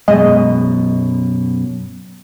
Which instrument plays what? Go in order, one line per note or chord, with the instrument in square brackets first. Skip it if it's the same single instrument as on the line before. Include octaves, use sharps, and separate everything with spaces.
[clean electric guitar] F#2 B2 [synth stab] G#3 D#5